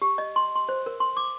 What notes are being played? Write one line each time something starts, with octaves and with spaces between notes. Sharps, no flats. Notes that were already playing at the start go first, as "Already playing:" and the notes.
G4
D#5
C6
C6
C5
A#4
C6
D6